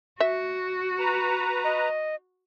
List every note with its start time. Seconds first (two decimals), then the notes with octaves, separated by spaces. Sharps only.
0.20 F#4 E5
0.99 B4 A#5
1.64 D#5